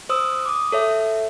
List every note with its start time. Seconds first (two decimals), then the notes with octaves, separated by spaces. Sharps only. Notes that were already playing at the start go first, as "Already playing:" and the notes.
0.09 C5 D#6 E6
0.46 D6 D#6
0.72 A4 C#5 E5